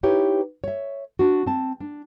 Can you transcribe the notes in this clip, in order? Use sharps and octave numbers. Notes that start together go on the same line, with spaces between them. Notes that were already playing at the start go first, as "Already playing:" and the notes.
D#4 E4 G4 B4 C#5
C#5 E5
D4 F#4
C4 A5
D4